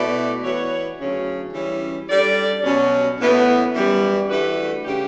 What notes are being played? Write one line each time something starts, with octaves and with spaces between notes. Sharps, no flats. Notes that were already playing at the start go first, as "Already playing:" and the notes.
Already playing: B2 A3 E4 B4 D5
E3 B3 F#4 C#5
D2 C#3 F#3 C#4
E3 G3 C#4
G3 D4 A4 D5
B2 F#3 C#4
A2 E3 B3
F#2 E3 G3
E3 A3 D4 F#4 B4
C#3 G3 D4 G4